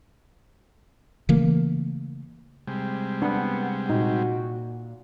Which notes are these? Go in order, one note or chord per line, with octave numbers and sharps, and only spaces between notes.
C#3 E3 A3 A#3
C3 G3 G#3
B3 D4 F#5
A#2 D#4 F#4